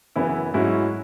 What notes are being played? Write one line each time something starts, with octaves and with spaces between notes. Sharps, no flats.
F#2 C#3 E3 B3 E4
G#2 F#3 C#4 E4